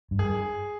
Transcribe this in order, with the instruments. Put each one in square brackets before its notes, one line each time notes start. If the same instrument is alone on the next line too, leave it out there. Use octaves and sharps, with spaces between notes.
[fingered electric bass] G2
[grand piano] G#4